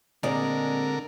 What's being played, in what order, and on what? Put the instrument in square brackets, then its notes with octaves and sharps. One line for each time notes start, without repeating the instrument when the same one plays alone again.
[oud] A#2 D5 [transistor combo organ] D3 A#4 [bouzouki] G#3 [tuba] C4